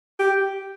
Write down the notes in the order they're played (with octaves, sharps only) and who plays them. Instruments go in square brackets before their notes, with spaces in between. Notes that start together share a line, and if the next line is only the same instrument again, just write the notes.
[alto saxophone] G4